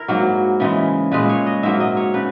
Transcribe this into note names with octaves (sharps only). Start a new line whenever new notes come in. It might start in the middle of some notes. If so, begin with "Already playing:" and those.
Already playing: E4 A#4
G#2 F#3 A#3
C#3 E3 G#3
A#2 G#3 B4
C#5
D#5
G#2 F#3 A#3 E5
D#5
C#5
C#3 B4